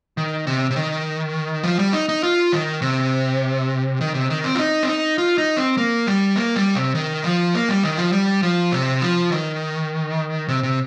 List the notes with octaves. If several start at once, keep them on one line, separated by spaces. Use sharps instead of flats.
D#3
C3
C3
D#3
F3
G3
D#4
D#4
F4
D#3
C3
D#3
C3
D#3
C4
F4
D#4
C4
D#4
F4
D#4
C4
A#3
G3
A#3
G3
C3
D#3
F3
A#3
G3
D#3
F3
G3
F3
C3
F3
D#3
C3
C3